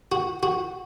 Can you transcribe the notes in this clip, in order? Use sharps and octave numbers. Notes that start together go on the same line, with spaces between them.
F#4
F#4